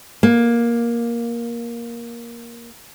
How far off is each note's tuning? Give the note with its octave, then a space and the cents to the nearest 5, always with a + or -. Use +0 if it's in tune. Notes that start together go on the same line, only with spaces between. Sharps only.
A#3 +10